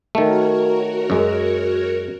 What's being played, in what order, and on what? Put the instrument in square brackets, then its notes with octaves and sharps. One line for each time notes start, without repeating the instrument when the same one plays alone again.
[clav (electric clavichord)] D#3 A3 [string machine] F#4 A#4 C#5
[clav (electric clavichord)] F#2 G#3